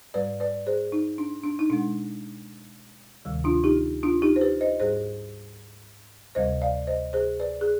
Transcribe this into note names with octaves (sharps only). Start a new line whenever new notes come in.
G#2 G3 B4 D5
B4 D5
G#4 C5
D#4
D4
D4
D#4
B2 G#3 D4
D2 C3 D#3 G3
D4 F4
D#4 G4
D4 F4
D#4 G4
C5
G4 B4
C5 D#5
G#2 G3 G#4 C5
D2 C3 G3 C5 D#5
D5 F5
C5 D#5
G#4 C5
B4 D5
G#4